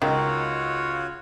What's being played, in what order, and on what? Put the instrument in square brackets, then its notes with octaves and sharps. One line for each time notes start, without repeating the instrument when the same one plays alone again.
[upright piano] C#2 [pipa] D#3 [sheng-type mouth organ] F4 F#4 C#5